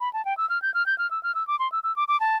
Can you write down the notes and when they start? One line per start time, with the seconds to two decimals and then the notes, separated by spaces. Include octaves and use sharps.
0.01 B5
0.13 A5
0.25 G5
0.37 E6
0.50 F6
0.62 G6
0.74 F6
0.86 G6
0.98 F6
1.11 E6
1.23 F6
1.35 E6
1.47 D6
1.59 C6
1.72 E6
1.84 E6
1.96 D6
2.08 D6
2.20 A5